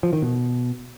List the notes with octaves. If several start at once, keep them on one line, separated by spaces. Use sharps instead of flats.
F3
D#3
B2